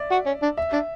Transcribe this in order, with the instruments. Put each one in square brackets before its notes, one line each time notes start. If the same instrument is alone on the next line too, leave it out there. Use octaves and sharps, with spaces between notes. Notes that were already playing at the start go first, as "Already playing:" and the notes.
Already playing: [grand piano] D5 E5
[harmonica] F#4
C#4
D4
[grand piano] E5
[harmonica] D4